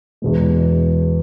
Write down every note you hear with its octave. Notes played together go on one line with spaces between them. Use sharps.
E2 B2 G#3